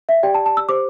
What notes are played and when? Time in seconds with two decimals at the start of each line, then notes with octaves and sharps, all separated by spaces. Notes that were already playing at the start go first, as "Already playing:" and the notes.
0.09 E5
0.23 G4 D5 G5
0.34 A5
0.46 A5
0.57 E6
0.69 G4 C5 D6